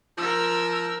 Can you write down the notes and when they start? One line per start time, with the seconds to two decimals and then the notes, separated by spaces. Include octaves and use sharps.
0.18 F3 A#4 E6